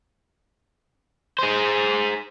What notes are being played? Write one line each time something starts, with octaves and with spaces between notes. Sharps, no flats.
G#4 C5